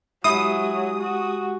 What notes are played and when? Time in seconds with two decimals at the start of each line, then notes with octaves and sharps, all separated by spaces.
0.24 F#3 G#3 E4 G4 D#6
0.99 F#4